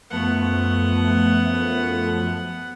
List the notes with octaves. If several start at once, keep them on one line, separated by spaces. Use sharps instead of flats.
F#2 F3 A3 B3 F#5